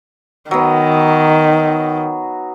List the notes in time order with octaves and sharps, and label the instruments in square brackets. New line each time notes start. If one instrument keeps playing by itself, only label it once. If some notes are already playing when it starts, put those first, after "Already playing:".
[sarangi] D#3 [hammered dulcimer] F#3 B3